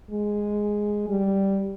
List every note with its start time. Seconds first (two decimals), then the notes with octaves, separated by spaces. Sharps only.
0.11 G#3
1.08 G3